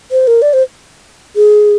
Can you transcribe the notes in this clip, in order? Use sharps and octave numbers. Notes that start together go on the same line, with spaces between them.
C5
A#4
D5
C5
G#4